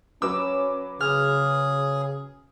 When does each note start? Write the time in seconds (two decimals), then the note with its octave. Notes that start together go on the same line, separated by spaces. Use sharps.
0.22 F#3 C#4 B4 D6 E6
1.00 C#3 G#4 F6